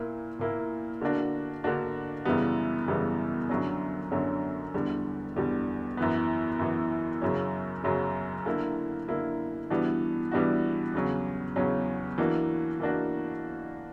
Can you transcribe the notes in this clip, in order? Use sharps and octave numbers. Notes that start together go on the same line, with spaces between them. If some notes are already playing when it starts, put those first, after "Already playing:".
Already playing: A#2 A#3 E4
A#2 A#3 E4
D3 A#3 D4 F#4
D3 A#3 D4 F#4
F#2 C#3 E3 G3 B3
F#2 C#3 E3 G3 B3
F#2 D3 F#3 C#4
F#2 D3 F#3 C#4
E2 D3 G3
E2 D3 G3
F#2 E3 B3
F#2 E3 B3
F#2 C#3 F#3 C#4
F#2 C#3 F#3 C#4
D3 A#3 E4
D3 A#3 E4
E3 G3 B3 D4 F#4
E3 G3 B3 D4 F#4
E2 C#3 F#3 C#4
E2 C#3 F#3 C#4
E3 A#3 D4 F#4
E3 A#3 D4 F#4